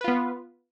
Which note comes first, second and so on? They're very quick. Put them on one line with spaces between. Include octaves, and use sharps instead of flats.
B4 F4 B3